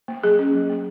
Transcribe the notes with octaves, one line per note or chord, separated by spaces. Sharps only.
A#3
F#3 G#4
C#4
F#3
A#3